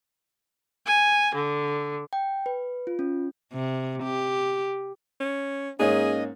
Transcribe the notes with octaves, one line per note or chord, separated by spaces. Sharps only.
G#5
D3
G5
B4
F4
C#4
C3
G4
C#4
G#2 A#3 C#4 G#4 C#5 D#5